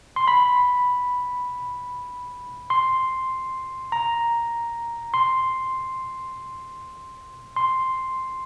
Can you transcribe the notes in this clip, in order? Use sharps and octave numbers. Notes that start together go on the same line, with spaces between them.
C6
B5
C6
A#5
C6
C6